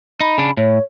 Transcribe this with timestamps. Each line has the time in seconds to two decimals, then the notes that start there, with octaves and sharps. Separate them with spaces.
0.21 D#4 B5
0.38 C#3 D4
0.57 A2 C#5